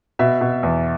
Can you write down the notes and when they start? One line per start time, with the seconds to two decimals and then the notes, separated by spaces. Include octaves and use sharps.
0.19 B2 E5
0.41 B2
0.63 E2